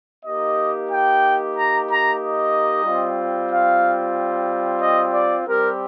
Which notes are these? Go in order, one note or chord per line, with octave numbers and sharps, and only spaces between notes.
A#3 D#4 G4 D#5
G5
A#5
A#5
D#5
G3 C4 F4
F5
D#5
D5
G3 C4 G4 A#4